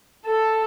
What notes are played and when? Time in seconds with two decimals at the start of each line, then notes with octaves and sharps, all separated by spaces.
0.26 A4